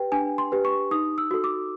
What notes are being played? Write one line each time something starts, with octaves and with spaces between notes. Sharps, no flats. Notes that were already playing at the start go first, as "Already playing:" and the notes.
Already playing: G4 B4 G5
D4 G#5
C6
G4 B4
C#6
D#4 D#6
E6
F#4 A4
D6